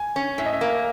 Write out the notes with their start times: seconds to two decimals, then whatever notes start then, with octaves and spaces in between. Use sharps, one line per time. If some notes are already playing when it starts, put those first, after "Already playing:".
Already playing: G#5
0.16 C#4
0.38 A2 E5
0.46 D#5
0.53 E5
0.61 A#3